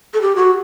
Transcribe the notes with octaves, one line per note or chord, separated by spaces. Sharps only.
A4
G4
F#4